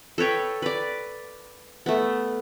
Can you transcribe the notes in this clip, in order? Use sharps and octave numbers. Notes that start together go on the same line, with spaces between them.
A4 B4 C#5 G5
B4 D5
A3 B3